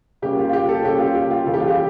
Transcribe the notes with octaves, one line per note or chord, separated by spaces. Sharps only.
C#3 G3 A#3 C#4 G4
F4
F4
G4
A4
C#3 G3 A#3 C#4 G4
F4
G4
F4
C#3 E3 G3 A4
G4
F4
G4